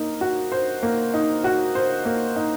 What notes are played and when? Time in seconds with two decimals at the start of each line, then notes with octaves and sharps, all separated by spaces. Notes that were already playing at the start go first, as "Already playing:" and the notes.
Already playing: A#3 D#4
0.21 F#4
0.52 C5
0.83 A#3
1.14 D#4
1.44 F#4
1.75 C5
2.05 A#3
2.36 D#4